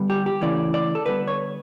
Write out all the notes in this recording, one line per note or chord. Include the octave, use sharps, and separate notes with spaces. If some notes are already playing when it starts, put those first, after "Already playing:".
Already playing: D3 G3 B3
G4
G4
C#3 E3 A3 D5
D5
A4
D3 G3 B3 B4
C#5